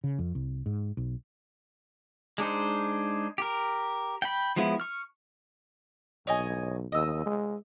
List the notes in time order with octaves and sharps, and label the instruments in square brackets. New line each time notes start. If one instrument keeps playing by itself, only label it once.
[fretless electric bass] C#3
F2
C2
G#2
B1
[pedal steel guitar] G#3 D4 D#4 C5
G4 A#4
G5 B5
F3 G#3 B3 E4
C#6 F6
[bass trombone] B1 [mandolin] C#5 D#5 G#5
[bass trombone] D#2 [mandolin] D#5 E6
[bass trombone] G#3